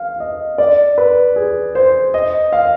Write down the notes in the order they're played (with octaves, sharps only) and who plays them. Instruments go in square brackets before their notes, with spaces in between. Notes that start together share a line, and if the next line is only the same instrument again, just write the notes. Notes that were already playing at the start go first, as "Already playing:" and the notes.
Already playing: [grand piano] F5
D#5
D5
B4
G#4
C5
D#5
F5